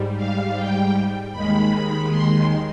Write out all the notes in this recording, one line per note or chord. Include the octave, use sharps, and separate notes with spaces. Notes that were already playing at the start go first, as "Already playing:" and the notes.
Already playing: G#2 G3
F5
G5
D#2 D#3 G#3 B5
C6